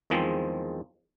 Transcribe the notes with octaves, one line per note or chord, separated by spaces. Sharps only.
E2 D#3 F3 G#3 C4